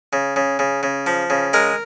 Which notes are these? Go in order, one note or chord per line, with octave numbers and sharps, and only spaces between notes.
C#3
C#3
C#3
C#3
F3
C#3
G#3 A#4